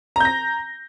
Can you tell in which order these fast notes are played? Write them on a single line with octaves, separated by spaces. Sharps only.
A#5 G6 A#6